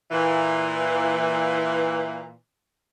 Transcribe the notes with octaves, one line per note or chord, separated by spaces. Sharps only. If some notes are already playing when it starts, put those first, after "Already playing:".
A#2 E3